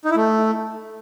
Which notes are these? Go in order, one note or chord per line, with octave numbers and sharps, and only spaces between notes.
D#4
E4
A3